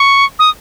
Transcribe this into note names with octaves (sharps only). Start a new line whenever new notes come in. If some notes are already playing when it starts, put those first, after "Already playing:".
Already playing: C#6
D#6